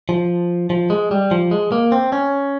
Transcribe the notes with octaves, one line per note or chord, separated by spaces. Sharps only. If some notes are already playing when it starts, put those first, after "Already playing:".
F3
F3
G#3
G3
F3
G#3
A#3
C4
C#4